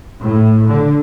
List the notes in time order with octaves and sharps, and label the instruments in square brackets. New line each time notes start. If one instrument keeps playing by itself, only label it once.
[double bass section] A2
D3